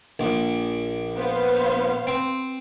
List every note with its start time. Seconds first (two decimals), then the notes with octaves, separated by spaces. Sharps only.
0.19 A#1
1.17 B3 C5 F5
2.07 C4